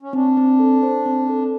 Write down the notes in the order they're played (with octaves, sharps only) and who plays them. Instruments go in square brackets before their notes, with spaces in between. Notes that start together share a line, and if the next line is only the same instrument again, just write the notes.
[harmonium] C#4
[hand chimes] C4 [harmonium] D4
[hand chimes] C4
A4
C5
C4
A4